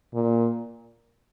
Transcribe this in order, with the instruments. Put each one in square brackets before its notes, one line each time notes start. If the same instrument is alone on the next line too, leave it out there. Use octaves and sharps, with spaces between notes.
[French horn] A#2